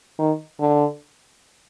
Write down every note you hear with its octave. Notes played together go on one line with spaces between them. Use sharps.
D#3
D3